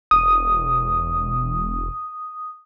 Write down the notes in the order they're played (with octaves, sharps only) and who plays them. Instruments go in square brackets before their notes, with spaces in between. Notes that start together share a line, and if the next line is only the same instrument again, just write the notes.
[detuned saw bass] E1 [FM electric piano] D#6